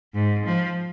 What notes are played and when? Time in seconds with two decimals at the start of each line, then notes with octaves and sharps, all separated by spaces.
0.14 G#2
0.45 F3